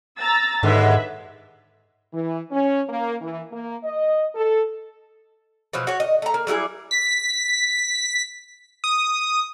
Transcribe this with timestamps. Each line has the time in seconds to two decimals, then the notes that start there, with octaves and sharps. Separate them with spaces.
0.18 A#5 E6 A6
0.63 D#2 G#2 D3 G#3 B4 E5
2.12 E3
2.51 C#4
2.89 A#3
3.21 E3
3.51 A#3
3.84 D#5
4.35 A4
5.73 B2 F3 F#3
5.87 F#4 C#5
6.00 D#5
6.22 A3 A#5
6.34 A#3
6.47 F#3 G3 E4 G#4
6.91 B6
8.84 D#6